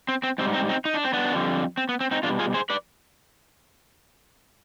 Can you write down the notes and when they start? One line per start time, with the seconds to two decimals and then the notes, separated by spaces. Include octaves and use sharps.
0.09 C4
0.23 C4
0.38 G#2 G3 C4
0.54 C4 D#4
0.69 C4 D#4
0.85 D#4
0.94 D4
1.05 C4
1.13 B3 D4
1.32 F2 D3 G3
1.77 C4
1.89 B3
2.00 C4
2.11 C4 D#4
2.23 B2 G3 D4 F4
2.39 F4 G#4
2.54 G#4 C5
2.70 B4 D5